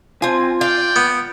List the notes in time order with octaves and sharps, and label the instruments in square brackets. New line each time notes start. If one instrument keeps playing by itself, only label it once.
[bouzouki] C4 G#5 [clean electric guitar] F4
[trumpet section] D5 G5 [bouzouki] F5
[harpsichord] B3